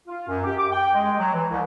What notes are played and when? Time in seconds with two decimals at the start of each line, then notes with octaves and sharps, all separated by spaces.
0.07 F4
0.27 F#2
0.44 G4
0.59 D6
0.71 G5
0.94 G#3
1.18 F#3
1.34 E3
1.51 C2